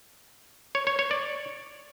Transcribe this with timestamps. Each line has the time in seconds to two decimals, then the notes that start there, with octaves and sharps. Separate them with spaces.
0.75 C#5
0.87 C#5
0.99 C#5
1.11 D5